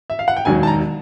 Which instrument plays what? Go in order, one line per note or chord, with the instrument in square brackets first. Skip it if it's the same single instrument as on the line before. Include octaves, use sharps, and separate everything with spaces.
[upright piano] E5
F5
F#5
G5
E1 D#2 D#3 F#3 G#5
A5
A#5